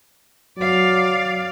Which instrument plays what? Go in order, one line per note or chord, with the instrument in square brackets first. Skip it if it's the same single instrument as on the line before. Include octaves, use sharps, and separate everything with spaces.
[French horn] F#3 [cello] D5 F5